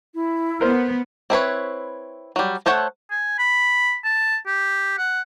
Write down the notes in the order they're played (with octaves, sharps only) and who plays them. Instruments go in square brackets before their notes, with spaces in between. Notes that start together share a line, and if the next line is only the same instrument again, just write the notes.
[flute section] E4
[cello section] B3 [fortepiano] A#4 C5
[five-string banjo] C4 E4 B4 C#5
F#3 G3
A3 A4 C5 C#5 F#5
[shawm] G#5
B5
A5
G4
F#5